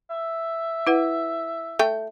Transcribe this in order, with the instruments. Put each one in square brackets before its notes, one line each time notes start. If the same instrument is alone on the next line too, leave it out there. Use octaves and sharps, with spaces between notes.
[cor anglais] E5
[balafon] E4 B4 F#5
[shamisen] A3 G5